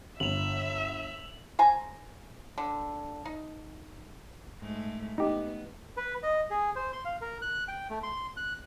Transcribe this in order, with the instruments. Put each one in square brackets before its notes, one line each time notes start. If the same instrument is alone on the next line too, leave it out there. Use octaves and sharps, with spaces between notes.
[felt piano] G1 [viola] E5 [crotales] F7 F#7
[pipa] C5 G#5 A#5
D3
D#4
[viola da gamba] G#2 A3
[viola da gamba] B3 [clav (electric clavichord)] D#4 G4
[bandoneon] B4
D#5
G#4
C5
C6
F5
A#4
F#6
G5
A3
C6
F#6